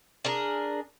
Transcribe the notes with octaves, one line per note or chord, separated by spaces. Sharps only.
D4 G#4 A#4